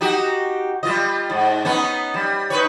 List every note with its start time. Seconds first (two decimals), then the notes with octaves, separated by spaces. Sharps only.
0.01 D#4 F#4 G4
0.83 G3 F4 D#5
1.30 G#2
1.65 B3 C#4 D#4
2.14 G3
2.50 D#4 B4 C#5